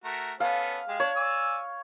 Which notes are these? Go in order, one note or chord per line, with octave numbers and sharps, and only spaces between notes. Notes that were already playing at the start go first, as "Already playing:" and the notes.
A3 F#4 A#4
B3 C#4 A4 F5
G#3 G4 G#4
D4 C#5
D5 G#5 E6